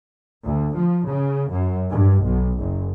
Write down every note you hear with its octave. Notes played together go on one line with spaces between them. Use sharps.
D2
F3
C#3
F#2
G2
B1
F#1